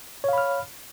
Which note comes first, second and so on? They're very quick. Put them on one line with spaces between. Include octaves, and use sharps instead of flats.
C#5 F5 B5 F6